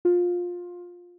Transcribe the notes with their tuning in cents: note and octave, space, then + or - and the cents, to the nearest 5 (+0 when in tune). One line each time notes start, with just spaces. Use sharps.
F4 +20